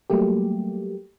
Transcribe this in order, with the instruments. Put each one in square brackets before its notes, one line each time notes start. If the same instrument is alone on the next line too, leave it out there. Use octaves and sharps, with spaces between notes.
[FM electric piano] F#3 G3 A3 A#3 G4